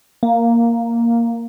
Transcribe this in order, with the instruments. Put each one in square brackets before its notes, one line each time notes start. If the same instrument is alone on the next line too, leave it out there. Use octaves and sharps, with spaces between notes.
[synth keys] A#3